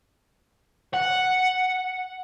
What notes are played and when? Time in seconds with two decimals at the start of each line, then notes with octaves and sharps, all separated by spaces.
0.94 F#5